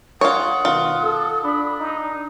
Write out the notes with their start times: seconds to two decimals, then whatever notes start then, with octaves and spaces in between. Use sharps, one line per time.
0.21 F4 C#5 F#5 D#6
0.65 B2 D#3 F4
1.03 A4
1.44 D4 B5
1.79 D#4